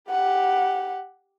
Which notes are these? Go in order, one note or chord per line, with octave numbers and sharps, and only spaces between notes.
G4 F#5